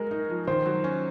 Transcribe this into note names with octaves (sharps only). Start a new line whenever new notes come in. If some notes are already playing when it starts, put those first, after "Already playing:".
Already playing: G#3 F#4 A#4
D#4
F3
D#3 C5
F#3
C#4